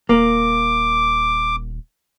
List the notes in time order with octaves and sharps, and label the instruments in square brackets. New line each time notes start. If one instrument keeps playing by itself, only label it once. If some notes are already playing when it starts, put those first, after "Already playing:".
[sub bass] D#1 [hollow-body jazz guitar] A#3 [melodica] D6